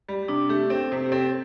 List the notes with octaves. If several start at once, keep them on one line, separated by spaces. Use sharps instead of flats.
G3
C3 D4
A3 G4
C4 A4
C3 C5
G4
C4 A4